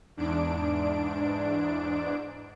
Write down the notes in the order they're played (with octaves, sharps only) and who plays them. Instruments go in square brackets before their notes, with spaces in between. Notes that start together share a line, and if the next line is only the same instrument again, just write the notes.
[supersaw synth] E2 G#2 D4 D7